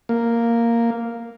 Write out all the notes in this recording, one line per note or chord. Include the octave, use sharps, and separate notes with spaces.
A#3